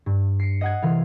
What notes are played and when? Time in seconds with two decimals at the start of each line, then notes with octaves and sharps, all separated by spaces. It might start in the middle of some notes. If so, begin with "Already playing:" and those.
0.06 G2
0.40 C7 C#7
0.61 D#5 F#5 G#6
0.82 C3 E3 F5